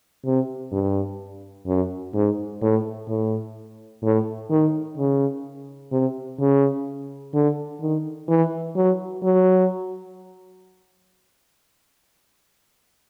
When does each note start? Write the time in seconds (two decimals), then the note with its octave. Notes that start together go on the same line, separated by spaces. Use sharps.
0.26 C3
0.72 G2
1.67 F#2
2.14 G#2
2.62 A2
3.09 A2
4.03 A2
4.51 D#3
4.97 C#3
5.92 C3
6.40 C#3
7.34 D3
7.81 D#3
8.29 E3
8.76 F#3
9.23 F#3